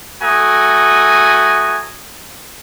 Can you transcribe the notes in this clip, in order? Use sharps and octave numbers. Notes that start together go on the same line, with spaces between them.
A3 F#4 G#5 A#5 D#6